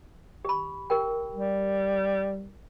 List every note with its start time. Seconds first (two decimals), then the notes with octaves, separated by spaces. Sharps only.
0.45 G4 B5
0.90 G4 A#4 G5
1.34 G3